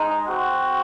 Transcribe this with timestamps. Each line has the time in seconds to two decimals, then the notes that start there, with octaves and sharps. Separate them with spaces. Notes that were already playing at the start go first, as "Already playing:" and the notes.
Already playing: G#3 D#4
0.27 C4 F#4